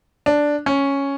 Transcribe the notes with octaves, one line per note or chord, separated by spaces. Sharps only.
D4
C#4